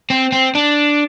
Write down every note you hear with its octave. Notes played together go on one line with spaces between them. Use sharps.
C4
C4
D4